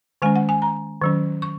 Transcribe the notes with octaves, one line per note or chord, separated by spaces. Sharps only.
D#3 G#3 C#4 G#5
F#5
G#5
A#5
D#3 F#3 C#4
C#6